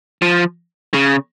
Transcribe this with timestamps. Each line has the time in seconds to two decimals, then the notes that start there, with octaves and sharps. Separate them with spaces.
0.22 F3
0.94 C#3